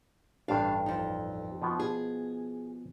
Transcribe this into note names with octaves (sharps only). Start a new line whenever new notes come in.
A1 G2 D4 F5
F2 D#4
B2 F3 B3
G#4